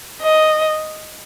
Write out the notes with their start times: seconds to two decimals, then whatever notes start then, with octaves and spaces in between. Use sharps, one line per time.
0.22 D#5